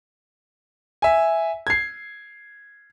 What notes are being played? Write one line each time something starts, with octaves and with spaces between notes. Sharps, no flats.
E5 G#5
G#6 C7